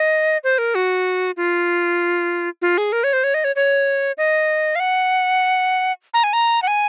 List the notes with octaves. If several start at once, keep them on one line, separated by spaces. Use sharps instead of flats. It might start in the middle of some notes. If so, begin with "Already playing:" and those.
Already playing: D#5
C5
A#4
F#4
F4
F4
G#4
A#4
C#5
C5
C#5
D#5
C#5
C#5
D#5
F5
F#5
A#5
G#5
A#5
F#5
G#5